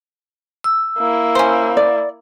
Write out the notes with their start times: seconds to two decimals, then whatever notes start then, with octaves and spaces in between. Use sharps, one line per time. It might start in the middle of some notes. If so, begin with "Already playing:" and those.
0.64 E6
0.99 A#3 E4
1.35 C#4 C5
1.77 D5